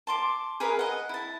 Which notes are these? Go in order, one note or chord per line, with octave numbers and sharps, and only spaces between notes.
A5 C6 D6
G#4 A#4 B4 E5
D#5 F#5
E4 A5